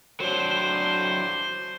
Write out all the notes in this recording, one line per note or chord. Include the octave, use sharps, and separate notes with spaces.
F#3 D4 C5